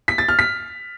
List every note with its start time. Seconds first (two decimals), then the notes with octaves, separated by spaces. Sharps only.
0.08 B6
0.18 A6
0.28 F6
0.39 B6